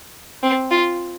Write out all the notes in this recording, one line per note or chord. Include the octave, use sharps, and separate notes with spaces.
C4
F4